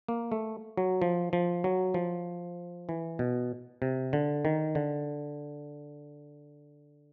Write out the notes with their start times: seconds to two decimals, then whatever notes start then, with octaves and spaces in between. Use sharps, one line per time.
0.08 A#3
0.32 A3
0.78 F#3
1.02 F3
1.33 F3
1.64 F#3
1.94 F3
2.89 E3
3.19 B2
3.82 C3
4.13 D3
4.45 D#3
4.75 D3